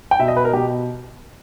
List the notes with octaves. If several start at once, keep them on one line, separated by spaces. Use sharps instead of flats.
G5
B2 E5
D#5
B4
A#4
B2 G4